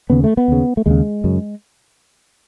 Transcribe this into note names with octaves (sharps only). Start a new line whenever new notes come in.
D#2 C#3 B3
A3
B3
D#2 C#3
A3
D#2 C#3 G#3
F#2 C#3